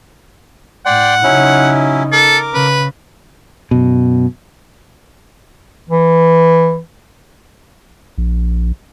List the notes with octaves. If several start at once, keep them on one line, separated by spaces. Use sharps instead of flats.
A2 D5 F#5 G5 C6
C#3 F#3 C#4 D#4 E4
A4 A#4 D6
C#3 B4
F#2 B2
E3
A#1